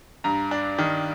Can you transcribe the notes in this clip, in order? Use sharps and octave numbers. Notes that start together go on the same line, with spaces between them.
G2 A#5
D4
D#3